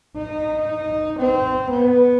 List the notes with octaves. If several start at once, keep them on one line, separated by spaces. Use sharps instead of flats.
D#4
C4
B3